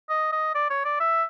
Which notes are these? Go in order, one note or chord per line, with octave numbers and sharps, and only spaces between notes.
D#5
D#5
D5
C#5
D5
E5